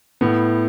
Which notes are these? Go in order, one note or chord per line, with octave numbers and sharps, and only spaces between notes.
A2 B3